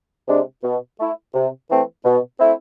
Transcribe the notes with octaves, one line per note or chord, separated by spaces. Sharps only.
C3 G#3 D4
B2
A3 E4
C3
E3 A3 C4
B2
A3 C4 E4